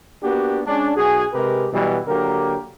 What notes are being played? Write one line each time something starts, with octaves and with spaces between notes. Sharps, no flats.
A#3 B3 D4 F#4 G4
G#3 C#4 D4
B1 F#4 G#4
C3 G#3 G4 A#4 B4
B2 E3 F#3 G3
D3 F#3 A#3 G4 A#4